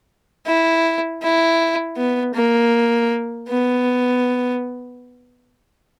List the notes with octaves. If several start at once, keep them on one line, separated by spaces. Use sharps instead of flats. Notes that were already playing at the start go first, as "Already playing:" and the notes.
E4
E4
B3
A#3
B3